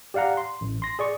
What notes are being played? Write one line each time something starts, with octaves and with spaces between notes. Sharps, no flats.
G4 D5 F5 F#5 A#5
C6
A1
C6 A#6
G#4 D5 C#6